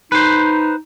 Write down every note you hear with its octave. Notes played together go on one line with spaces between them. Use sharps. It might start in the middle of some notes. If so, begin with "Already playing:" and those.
D#4 B4 C5